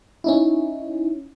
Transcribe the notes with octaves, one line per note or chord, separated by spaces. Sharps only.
C#4 D#4 E4